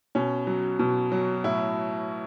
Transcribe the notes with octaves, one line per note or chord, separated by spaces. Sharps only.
B2 C#4
F#3
B2
F#3
A2 E4